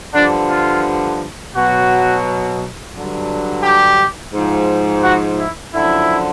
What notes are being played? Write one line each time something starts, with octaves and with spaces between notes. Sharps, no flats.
G2 D3 F3 D4
F4
B2 F#3 F#4
G2 D3 F#3
G4
G#2 F3
F#4
E4
F#2 D3 F3 E4